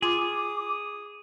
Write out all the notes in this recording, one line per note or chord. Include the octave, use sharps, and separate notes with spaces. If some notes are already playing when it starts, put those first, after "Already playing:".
F4 G#4 D6
D#6